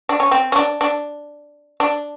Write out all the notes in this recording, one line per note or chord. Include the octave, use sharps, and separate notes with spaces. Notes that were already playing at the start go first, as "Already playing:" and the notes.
D4
C#4
C4
C#4
D4
D4
D4